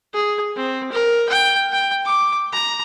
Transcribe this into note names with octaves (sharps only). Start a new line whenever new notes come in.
G#4
C4
A#4
G5
G5
D6
A#5